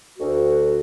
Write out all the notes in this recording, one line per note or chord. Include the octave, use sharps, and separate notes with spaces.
D2 F#4